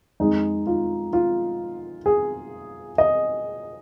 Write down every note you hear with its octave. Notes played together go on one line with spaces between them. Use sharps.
F2 D#3 G#3 D#4
F4
F4
G#4
D#5